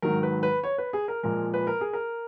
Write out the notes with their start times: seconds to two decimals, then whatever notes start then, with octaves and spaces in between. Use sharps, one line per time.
0.02 G#2 D#3 F#3 A#4
0.23 B4
0.43 B4
0.63 C#5
0.78 B4
0.93 G#4
1.08 A#4
1.23 A#2 F3 G#3 A#4
1.54 B4
1.67 A#4
1.81 G#4
1.93 A#4